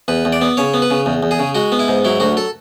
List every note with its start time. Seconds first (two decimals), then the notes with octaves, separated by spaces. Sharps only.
0.08 E2 B4
0.25 E2
0.33 D5
0.41 B3
0.57 C#3 C#5
0.74 B3
0.82 B4
0.90 C#3
1.06 E2
1.23 E2
1.31 G#4
1.39 C#3
1.55 G#3 F#4
1.72 B3
1.79 E4
1.88 G#2
2.05 F#3 E4
2.20 D2 F#4
2.37 A4